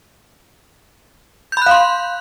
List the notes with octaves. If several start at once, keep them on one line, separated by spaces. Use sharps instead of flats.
F5 B5 C6 F#6 G6